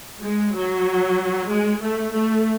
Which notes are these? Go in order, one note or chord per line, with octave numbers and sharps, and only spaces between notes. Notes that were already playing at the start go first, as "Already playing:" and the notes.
G#3
F#3
G#3
A3
A3